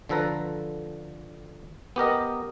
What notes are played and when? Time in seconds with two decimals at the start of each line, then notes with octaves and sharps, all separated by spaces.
0.09 D3 F3 A4 B4 A#5
1.96 B3 G4 A#4 D#5